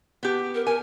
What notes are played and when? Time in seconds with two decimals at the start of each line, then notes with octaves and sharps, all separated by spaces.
0.23 B3 G4
0.55 A#4
0.66 A#4 G#5